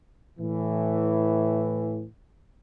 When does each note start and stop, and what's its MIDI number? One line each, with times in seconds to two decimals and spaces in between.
0.39 2.06 45
0.39 2.06 52